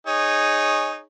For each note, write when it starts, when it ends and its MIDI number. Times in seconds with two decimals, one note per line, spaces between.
0.07 1.01 63
0.07 1.01 68
0.07 1.01 73